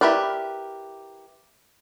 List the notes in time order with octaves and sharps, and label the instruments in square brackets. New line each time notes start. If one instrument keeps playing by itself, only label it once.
[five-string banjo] E4 G4 A#4 B4 D5